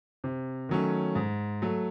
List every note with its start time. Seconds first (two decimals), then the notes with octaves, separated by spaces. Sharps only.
0.24 C3
0.69 D#3 F#3 A3 C#4
1.15 G#2
1.62 F#3 A3